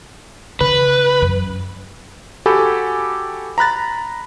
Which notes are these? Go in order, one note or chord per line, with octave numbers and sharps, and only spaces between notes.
C#3 B4
F#2
F#4 G4 A4 G#5 B5
A#5 B5 F#6 A6